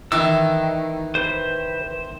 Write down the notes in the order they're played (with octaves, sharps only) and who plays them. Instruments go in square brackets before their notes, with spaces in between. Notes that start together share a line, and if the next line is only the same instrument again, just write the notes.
[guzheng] D#3 [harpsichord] E3 [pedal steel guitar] E6
[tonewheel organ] B4 [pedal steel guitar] C5